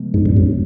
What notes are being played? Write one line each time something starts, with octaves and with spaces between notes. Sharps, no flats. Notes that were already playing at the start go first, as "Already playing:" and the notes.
Already playing: C3 F3 G#3 B3
G#2
G2
F#2